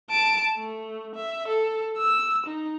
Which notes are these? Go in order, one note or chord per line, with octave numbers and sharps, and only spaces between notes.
A5 D7
A3
E5
A4
E6
D#4